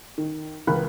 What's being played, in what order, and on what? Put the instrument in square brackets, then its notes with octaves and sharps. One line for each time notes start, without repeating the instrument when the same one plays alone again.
[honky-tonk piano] D#3
C#2 E3 A#4 B5 F#6